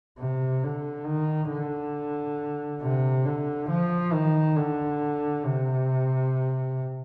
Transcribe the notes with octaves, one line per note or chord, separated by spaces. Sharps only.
C3
D3
D#3
D3
C3
D3
F3
D#3
D3
C3